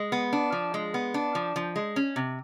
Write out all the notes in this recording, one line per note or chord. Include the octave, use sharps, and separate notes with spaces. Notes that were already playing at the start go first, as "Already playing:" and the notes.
Already playing: G#3
B3
D4
F3
G#3
B3
D4
F3
F3
G#3
C#4
C3